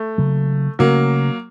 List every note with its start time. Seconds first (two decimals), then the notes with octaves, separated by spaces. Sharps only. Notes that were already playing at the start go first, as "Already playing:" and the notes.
Already playing: A3
0.18 C#3 F#3 A#3
0.79 C#3 F#3 A3 A#3 C#4